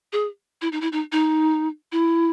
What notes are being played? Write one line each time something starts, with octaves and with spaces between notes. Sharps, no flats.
G#4
E4
D#4
E4
D#4
D#4
E4